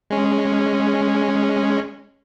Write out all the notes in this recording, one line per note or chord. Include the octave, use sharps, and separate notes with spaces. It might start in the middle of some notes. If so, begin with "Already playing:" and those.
G#3 C#4